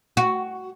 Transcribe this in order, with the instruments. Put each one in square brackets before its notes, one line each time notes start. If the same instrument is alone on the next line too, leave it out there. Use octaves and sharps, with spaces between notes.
[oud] F#4